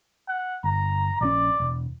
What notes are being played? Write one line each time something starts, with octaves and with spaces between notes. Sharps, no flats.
F#5
G1 A#5
A#1 F3 C#4 D5
E1